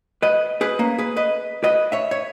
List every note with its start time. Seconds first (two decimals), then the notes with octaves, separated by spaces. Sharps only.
0.22 B4 D#5
0.61 G#4 B4
0.79 A#3 C#4
0.98 G#4 B4
1.17 B4 D#5
1.64 B4 D#5
1.92 C#5 E5
2.11 C#5